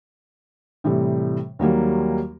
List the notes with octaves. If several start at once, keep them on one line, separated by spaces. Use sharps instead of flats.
A2 C3 E3 G3
D#2 F#3 G3 A#3